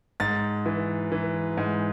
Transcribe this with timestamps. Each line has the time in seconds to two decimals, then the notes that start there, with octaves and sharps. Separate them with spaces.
0.20 G#2 A6
0.66 E3
1.12 E3
1.57 G#2